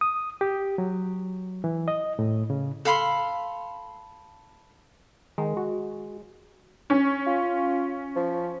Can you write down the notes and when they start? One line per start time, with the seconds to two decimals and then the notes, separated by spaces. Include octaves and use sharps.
0.01 D#6
0.41 G4
0.78 F#3
1.64 E3
1.88 D#5
2.19 A2
2.50 C#3
2.85 A4 F5 B5 C6
5.38 D#3 G#3
5.57 F#4
6.90 C#4
7.27 F4
8.16 F3